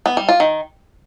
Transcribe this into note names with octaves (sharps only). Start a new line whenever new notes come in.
B3
G3
F4
D#3